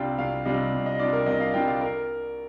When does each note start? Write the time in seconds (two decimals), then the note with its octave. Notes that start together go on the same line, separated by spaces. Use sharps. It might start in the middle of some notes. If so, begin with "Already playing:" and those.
Already playing: C2 C3 G3 D4 F4 F5 G5
0.18 C2 F5
0.45 C3 G3 D4 F4 D#5
0.73 C2
0.86 D#5
0.99 C3 G3 D4 F4 D5
1.13 A#4
1.26 C2 D#5
1.40 F5
1.54 C3 G3 D4 F4 G5
1.67 F5
1.81 A#4